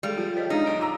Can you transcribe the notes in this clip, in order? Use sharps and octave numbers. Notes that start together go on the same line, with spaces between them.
G3 G#3 G#4 A4
F3 G4
C5 C#5 D#5
G#3 D4 D#4 G#4
B1 D7
F4 A#5 E6 A#6